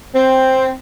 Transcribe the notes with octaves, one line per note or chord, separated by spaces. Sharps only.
C4